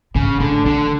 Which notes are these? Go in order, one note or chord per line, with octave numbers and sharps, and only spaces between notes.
G#2 C#3
A2 D3
D3 D#3